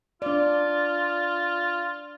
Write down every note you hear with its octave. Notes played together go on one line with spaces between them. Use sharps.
D4 F4 D5